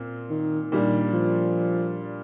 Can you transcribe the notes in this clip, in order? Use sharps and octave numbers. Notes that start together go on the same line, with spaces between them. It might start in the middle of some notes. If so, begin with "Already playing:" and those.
Already playing: A#2 C4
D#3
A#2 D#3 G3 D4
F3